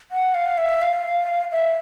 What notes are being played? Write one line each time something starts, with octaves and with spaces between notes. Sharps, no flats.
F#5
F5
E5
F5
E5